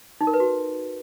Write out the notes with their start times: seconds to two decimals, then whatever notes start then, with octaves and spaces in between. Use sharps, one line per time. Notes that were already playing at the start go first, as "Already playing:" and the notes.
0.21 D#4
0.27 A#4
0.34 B4
0.40 F#4